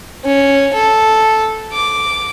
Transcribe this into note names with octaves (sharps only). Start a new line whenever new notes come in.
C#4
A4
D6